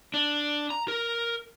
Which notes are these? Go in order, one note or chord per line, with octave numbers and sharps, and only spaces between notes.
D4
A#5
A#4